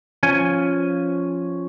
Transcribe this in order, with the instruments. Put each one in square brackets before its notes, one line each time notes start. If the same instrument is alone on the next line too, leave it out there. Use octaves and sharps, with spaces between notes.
[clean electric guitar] F3 C#4 G#5